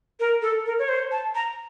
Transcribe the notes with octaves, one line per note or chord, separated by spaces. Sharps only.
A#4
A4
A#4
C#5
C5
A5
A#5